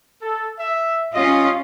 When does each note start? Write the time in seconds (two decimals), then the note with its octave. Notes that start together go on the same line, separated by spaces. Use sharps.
0.22 A4
0.59 E5
1.14 G3 C#4 F4 D#5